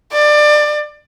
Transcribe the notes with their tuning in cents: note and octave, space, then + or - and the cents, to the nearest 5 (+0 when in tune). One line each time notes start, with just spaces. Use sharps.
D5 +25